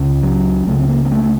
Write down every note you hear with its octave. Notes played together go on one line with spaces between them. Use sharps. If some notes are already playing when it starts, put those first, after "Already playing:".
Already playing: C#2 C#3
F#3
C#2 C#3 A3
C4
A#3
A#3
A3